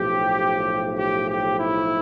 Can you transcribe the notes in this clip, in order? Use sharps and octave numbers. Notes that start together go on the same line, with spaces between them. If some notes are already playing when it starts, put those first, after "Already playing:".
Already playing: B1 A2 F3 G4
G4
G4
E4